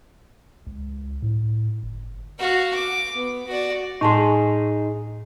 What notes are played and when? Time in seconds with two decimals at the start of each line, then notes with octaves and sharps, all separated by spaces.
0.67 C#2
1.22 A2
1.83 G1
2.39 F#4 F5
2.75 D6
3.14 B3
3.47 F#4 D5
4.01 A2 D#4 G#4 A5 C6